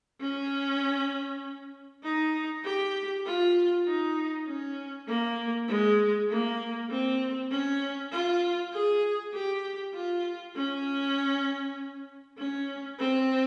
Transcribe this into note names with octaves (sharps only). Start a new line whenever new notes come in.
C#4
D#4
G4
F4
D#4
C#4
A#3
G#3
A#3
C4
C#4
F4
G#4
G4
F4
C#4
C#4
C4